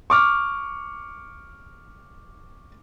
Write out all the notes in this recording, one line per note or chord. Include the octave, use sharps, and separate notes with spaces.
C#6 D6 F6